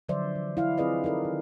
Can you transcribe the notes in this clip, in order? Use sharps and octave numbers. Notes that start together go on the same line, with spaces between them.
D3 F3 F#3 C5 D5 E5
E3
E4 F5
C4 F4 G#4 B4 D5 D#5
D#4 A4 A#4 D5
D#3